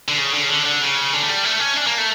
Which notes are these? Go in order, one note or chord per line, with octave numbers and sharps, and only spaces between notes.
D3
C#3
D3
C#3
D3
D3
C#3
D3
A3
G3
A3
C#4
D4
A#3
A3